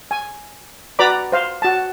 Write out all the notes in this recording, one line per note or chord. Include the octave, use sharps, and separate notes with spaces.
G#5
F#4 B4 D5 A#5 B5 D6
C5 F5
F#4 A5